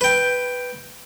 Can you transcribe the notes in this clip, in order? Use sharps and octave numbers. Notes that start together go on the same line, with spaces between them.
B4 G5